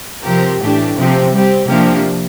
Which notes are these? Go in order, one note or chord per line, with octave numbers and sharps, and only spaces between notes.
C3 F3 C4 G4 A#4
A2 E3 A3 D4 G4
C3 F3 C4 G4
G3 C4 G4
C3 F3 A#3 D4 G4